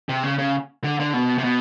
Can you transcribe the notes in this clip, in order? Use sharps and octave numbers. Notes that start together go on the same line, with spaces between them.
C3
C#3
C#3
D3
D3
B2
C3
B2